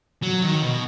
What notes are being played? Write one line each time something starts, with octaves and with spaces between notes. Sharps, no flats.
F#3
D#3
B2